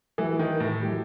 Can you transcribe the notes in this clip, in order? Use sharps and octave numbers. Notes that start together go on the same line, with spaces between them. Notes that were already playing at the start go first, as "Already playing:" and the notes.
E3 F#3 A3 E4 G4
D#3
A2
F#3 A3 E4 G4